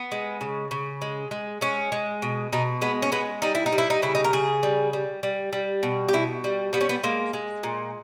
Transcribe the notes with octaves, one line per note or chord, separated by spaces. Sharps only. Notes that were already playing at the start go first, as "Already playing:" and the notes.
Already playing: B3
G#3
C#3
C#3
G#3
G#3
G#3 C#4
G#3
B2
B2 D#4
G#3 B3
C#4
G#3 B3
G3 D#4
E4
D#4
G3
E4
D#4
C#3 E4
D#4
A#4
C#3 G#4
G3
G3
G3
G3
B2
G4
B2 E4
G3
G3 B3
C#4
B3
G#3 A#3
G#3
A#2